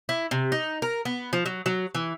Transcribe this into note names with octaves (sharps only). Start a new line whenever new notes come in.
E4
C3
D#4
A#4
B3
F3
F#3
F#3
E3